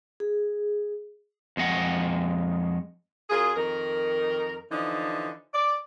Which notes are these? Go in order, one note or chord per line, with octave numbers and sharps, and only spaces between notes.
G#4
F2 G#3 D#5 F#5
F#2 F4 G#4
F2 D#3 A#4
D3 E3 F3 D4 D#4
D5